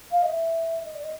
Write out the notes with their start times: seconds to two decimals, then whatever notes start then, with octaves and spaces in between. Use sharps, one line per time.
0.11 F5
0.22 D#5
0.29 E5
0.85 D#5
0.95 D5
1.03 D#5